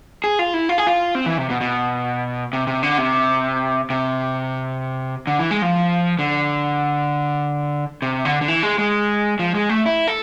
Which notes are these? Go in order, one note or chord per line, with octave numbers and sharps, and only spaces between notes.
G#4
F4
E4
F4
G#4
F4
C4
E3
C3
B2
B2
C3
C3
D3
C3
C3
D3
E3
G#3
F3
D3
C3
D3
D3
E3
G#3
G#3
F3
G#3
A3
E4
A4